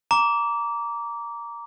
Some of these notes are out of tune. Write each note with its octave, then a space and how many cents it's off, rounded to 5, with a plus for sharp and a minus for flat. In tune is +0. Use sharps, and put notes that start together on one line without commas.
A#5 +0 D6 -20